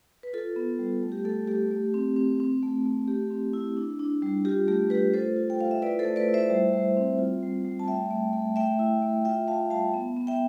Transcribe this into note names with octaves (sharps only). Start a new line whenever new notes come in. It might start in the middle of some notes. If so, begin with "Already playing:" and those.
B4
F4 A4
B3
G3
A3
G4
A3 A4
A3 G4
A3
C4
C4
C4
A3
A3
A3 G4
C4
E4
D4
D4
G3
F4 G4
A3 G4
A3 G4 B4
F4 A4 C5
F4
G5
F4 F5
E5
E4 B4 D5
A4 C5
A3
B4 D5
E4
C5 E5
G3
G3
C4
F4
G3
G3
A5
A3 E5 G5
A3
A3
A3 E5 G5
E4
A3
F4 E5 G5
F4 F5 A5
G3 F5 A5
B3
B3
E5 G5